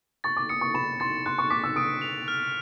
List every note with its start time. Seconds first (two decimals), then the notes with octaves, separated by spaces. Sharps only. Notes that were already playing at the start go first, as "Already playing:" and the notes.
0.24 C#6 A6
0.37 D6
0.49 D#6 C#7
0.61 C#6
0.74 B5 E7
1.00 C6 A6
1.26 C6 F#6
1.38 C#6
1.50 D6 B6
1.64 E6
1.76 D#6 D7
2.02 F7
2.28 F6